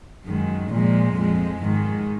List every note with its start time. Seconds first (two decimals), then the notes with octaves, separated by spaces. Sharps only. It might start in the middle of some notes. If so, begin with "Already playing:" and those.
0.25 F#2 D#3 G#3
0.70 A#2 F3 G#3
1.16 F2 F3 G#3
1.61 G#2 D#3 G#3